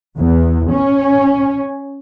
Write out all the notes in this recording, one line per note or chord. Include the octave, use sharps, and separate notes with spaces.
E2
C#4